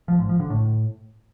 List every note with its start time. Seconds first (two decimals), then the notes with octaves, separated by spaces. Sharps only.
0.08 F3
0.19 G#2
0.29 F3
0.40 D3
0.50 A2